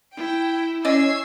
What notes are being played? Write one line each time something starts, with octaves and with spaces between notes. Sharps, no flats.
E4 G5
C#4 D5 D#5 E6 G#6 C7